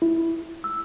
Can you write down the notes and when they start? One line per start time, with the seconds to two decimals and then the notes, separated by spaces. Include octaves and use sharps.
0.02 E4
0.64 E6